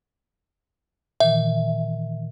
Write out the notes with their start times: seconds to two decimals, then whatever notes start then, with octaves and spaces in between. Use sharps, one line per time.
1.20 A#2 D#3 E3 E5